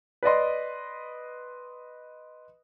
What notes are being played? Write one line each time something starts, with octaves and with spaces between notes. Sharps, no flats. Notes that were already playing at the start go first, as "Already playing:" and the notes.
B4 D5 D#5 C6